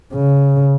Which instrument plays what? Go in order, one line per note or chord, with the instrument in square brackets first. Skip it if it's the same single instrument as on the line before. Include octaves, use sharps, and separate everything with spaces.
[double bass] C#3